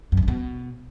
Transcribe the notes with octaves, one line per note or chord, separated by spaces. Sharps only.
F#2
C3
G2
B2